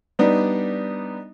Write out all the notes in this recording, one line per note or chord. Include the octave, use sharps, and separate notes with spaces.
G3 B3 D4 D#4